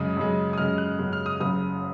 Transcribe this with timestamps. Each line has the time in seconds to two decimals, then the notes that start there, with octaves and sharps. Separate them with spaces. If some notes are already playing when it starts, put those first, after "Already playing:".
Already playing: F#2 C#3 G#3 D#6
0.17 F#2 C#3 G#3
0.53 D#6
0.58 F#2 C#3 G#3 F6
0.78 F#6
0.99 F#2 C#3 G#3
1.13 F6
1.26 D#6
1.40 F#1 F#2 C#3 D#6